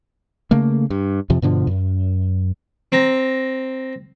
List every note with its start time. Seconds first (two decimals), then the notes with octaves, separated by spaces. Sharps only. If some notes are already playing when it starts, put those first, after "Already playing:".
0.51 C#3 A3 A#3
0.90 G2
1.30 F2 C3 F3
1.42 G2 B2 D3 F3
1.67 F#2
2.92 C4 A#5